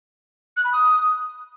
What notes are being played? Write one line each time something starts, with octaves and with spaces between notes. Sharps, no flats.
F#6
B5
D#6